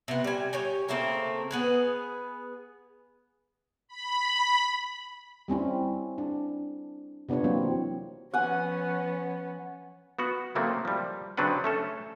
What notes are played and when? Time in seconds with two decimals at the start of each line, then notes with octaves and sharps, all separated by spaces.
0.08 C3 B3
0.24 G3 G#5
0.53 G4 C#5 G#5
0.88 C#3 A3 A#3 C4
1.51 B3 G#4 B4
3.88 B5
5.48 G3 C4 C#4 E4
6.18 D4
7.29 C3 B3 D4 F4 C#5
7.44 E3 F#3 A#3 C4 D4 E4
8.33 F3 B3 C#4 F#5 G#5
10.19 B3 F#4 F#5
10.55 C#3 F#3 A3 A#3 C4
10.85 F3 G3
11.37 C#3 F#3 C4 D4 B4 F#5
11.64 A3 C#4 A4